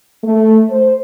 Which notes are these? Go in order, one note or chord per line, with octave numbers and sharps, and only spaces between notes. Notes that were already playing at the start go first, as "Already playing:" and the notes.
A3
C5